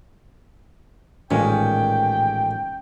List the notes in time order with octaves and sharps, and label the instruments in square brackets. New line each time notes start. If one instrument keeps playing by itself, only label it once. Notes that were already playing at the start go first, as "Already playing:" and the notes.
[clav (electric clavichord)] A1 D#3 G#3 [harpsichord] A#2 [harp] C#4 G#5 [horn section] G5